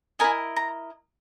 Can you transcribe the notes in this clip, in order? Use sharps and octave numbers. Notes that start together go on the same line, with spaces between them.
E4 A#4 D#5 G#5
A#5